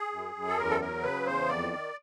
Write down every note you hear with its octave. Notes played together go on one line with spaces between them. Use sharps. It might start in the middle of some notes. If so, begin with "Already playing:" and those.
Already playing: G#4
F#2
F#2
A4
E2 A#4
A4
F#3 A#4
C#3 B4
E2 C5
F2 D5
D#3